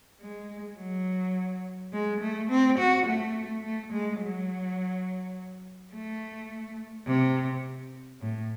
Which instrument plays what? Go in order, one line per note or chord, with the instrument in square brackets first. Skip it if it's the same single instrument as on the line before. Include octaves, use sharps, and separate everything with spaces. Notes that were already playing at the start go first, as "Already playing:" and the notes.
[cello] G#3
F#3
G#3
A3
C4
F#4
A3
A3
G#3
F#3
A3
C3
A2